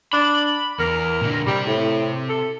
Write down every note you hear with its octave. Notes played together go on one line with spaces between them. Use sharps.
D4 B5
E2 A#4
A#2 D3
C3 G3 G4
A2
A4